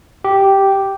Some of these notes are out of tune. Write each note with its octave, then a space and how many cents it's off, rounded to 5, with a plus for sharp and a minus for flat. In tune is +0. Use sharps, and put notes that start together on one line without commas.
G4 -5